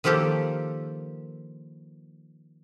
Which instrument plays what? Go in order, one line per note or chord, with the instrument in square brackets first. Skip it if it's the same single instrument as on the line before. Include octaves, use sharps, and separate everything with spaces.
[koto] D#3 F3 A#3 G4 A4